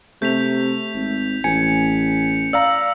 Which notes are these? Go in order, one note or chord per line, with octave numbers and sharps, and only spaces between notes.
C3 A3 G6 B6 F7
G#1
A1 G#5 C#7
D5 F5 A#5 E6